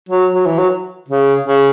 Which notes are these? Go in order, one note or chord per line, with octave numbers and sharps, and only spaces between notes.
F#3
F#3
E3
F#3
C#3
C#3